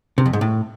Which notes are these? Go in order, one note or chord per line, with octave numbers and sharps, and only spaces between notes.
C3
F2
G#2
A2